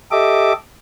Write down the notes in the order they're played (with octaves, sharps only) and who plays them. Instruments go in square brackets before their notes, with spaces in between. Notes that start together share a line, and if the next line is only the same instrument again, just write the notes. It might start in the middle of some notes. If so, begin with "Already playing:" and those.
[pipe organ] G4 A4 D#5 E5 D6